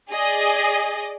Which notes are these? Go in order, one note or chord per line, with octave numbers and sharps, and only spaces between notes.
G#4 D5 D#5